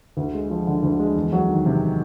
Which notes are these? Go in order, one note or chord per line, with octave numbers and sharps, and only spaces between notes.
D2
G#3
F3
D3
D2
G#3
E2
F#3
D#3
C3